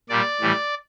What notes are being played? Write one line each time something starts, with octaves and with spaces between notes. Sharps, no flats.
A#2 G3 D5
A2 E3 G3